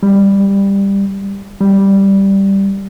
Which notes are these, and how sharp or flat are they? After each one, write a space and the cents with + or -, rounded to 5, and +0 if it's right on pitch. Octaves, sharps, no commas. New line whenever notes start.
G3 +15
G3 +0